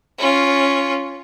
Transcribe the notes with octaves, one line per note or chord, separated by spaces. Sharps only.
C#4 F4